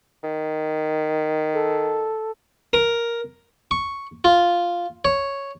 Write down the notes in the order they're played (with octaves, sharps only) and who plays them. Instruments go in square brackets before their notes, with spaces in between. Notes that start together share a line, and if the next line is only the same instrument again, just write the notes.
[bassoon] D#3
[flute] A4
[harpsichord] A#4
C#6
F4
C#5